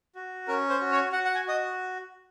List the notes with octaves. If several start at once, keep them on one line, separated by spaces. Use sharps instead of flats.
F#4
C#4 A#4
C5
F#4
C#5
F#4 F#5
F#5
G#5
F#4 D#5